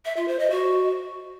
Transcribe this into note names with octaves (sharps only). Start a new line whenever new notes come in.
E5
F4
C5
D#5
F#4